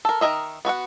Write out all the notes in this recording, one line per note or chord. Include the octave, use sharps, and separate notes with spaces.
A4 A#4
D#3 G#4 A#4 D#5 E5
B3 F#4 A4 F#5